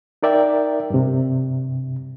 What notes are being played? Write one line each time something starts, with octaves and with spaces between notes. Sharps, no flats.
D#4 A#4 D5 E5 G5
G2 C3